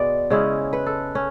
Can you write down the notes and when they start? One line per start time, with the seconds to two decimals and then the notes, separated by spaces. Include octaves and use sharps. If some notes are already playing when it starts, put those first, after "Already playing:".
Already playing: B2 G#3 B3 D5
0.30 C#3 G#3 C#4 E4
0.73 B4
0.86 A4
1.15 C#4